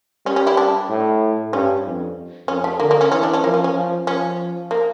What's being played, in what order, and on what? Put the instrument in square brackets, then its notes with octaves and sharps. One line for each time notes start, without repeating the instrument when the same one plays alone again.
[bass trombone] G3 [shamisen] C#4
[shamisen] C#4
E4
D4
[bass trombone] A2
[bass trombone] G2 [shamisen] C#4
[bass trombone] F2
[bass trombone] F2 [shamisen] C#4
[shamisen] A3
[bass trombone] D3 [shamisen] A#3
[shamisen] A#3
C#4
[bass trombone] E3 [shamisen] C#4
[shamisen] D4
C#4
[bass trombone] F3 [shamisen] A#3
[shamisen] C#4
C#4
[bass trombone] F3
[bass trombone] F3 [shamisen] C#4
[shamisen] A#3